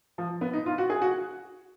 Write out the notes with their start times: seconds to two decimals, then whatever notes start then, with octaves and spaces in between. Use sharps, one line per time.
0.18 F3
0.41 B3
0.53 D#4
0.66 F4
0.78 F#4
0.90 G#4
1.02 F#4